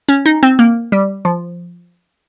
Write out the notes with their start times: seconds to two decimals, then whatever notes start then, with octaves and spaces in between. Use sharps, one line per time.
0.09 C#4
0.26 D#4
0.43 C4
0.59 A#3
0.92 G3
1.25 F3